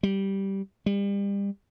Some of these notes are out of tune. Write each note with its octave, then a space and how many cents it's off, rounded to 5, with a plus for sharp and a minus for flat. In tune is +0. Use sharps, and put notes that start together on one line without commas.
G3 -10
G3 +35